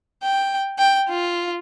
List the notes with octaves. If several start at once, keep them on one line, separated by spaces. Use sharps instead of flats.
G5
G5
F4